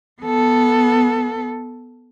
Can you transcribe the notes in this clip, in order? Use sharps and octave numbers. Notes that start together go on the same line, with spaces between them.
B3 A4